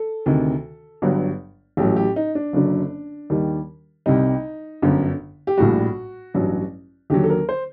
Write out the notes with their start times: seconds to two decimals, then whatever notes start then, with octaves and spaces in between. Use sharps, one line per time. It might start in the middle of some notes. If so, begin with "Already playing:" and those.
Already playing: A4
0.26 D2 C3 D#3
1.02 G1 G2 F#3
1.77 A1 A2 F#3 G4
1.96 G4
2.16 D#4
2.35 D4
2.53 F#1 F#2 D3 F#3
3.30 D#2 D#3 G3
4.06 C2 C3 G3 D#4
4.82 G1 F#2 D3
5.47 G4
5.57 A#1 A2 G3 F#4
6.34 A1 G2 F#3
7.10 D#2 D3 F#3 G4
7.24 A4
7.30 A#4
7.49 C5